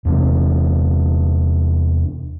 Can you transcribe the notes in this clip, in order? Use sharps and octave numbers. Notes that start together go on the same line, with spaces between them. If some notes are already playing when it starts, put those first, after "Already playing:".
E2 C3 C4